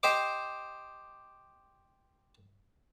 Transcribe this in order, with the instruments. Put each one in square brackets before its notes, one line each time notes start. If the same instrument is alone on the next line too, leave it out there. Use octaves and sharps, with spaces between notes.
[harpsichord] G4 C5 D#5 D6